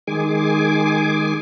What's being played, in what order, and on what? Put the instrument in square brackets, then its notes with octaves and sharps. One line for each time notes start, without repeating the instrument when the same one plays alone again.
[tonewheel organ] D#3 G#3 G#4 G#5 D6